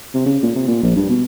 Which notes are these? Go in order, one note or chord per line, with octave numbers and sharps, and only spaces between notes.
C3
C#3
A#2
C3
A#2
A#1
G2
B2